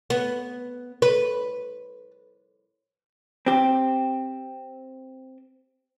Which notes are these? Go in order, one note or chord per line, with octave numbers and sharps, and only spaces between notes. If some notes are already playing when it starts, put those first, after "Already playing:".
B3
B4
C4 G4